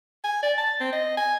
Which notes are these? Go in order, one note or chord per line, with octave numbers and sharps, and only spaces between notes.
G#5
D5
A5
C4
D#5
G#5